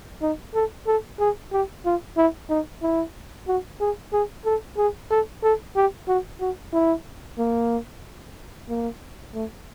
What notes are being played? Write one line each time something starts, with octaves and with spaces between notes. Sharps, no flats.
D#4
A4
A4
G#4
G4
F4
E4
D#4
E4
F#4
G#4
G#4
A4
G#4
A4
A4
G4
F#4
F#4
E4
A#3
A#3
A3